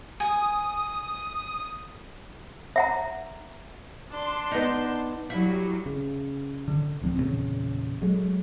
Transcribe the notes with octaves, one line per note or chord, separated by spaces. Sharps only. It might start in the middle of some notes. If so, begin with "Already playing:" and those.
G#5 D#6
E5 F#5 A#5
D4 A5 C6
B3 D#4
F#3 G3 E4
C#3
D3
D#1 D2 F3 C4
E2 A#2 C#3
F#3 G#3 A3